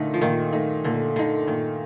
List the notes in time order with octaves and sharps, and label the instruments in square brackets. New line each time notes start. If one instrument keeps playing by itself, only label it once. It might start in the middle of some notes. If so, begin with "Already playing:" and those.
Already playing: [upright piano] A#2 A3 D#4 [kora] D3
[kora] F3
[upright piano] A#2 [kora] D#3
[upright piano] A3 D#4
[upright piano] A#2 [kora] D3
[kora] D3 [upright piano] A3 D#4
[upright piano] A#2 [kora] D#3